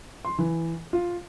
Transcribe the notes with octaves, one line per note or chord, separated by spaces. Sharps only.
C6
E3
F4